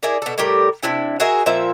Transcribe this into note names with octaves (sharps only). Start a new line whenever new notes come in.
E4 G#4 A#4 D5
B2 A4
A2 G3 G4 A#4
C3 D4 E4 G5
F#4 G#4 A#4 E5
A#2 F3 C4 E5